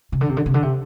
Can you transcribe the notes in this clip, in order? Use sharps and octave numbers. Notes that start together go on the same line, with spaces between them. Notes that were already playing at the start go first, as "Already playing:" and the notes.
C3
D3
C3
D3
C3
D3
C3